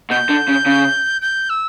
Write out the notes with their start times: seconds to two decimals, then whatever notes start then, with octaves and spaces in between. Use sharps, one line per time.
0.10 B2 G6
0.29 D3
0.48 C#3
0.66 C#3
1.21 G6
1.49 E6